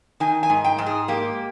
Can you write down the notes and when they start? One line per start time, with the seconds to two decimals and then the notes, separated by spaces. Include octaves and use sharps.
0.20 D#3 G#5
0.43 G#5
0.50 G#2
0.65 G5
0.78 G#2
0.86 G#4
1.08 A#3 G4